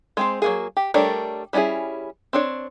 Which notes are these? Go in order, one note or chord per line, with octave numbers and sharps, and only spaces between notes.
G#3 C4 C5
F#3 A#3 G#4
G4
G3 A3 D4 A#4 C#5
G3 C#4 D#4 E4 G#4
C4 D4 C#5